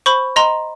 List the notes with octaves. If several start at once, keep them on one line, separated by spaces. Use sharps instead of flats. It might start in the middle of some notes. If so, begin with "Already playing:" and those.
C5 B5 C#6
D#5 A#5 C6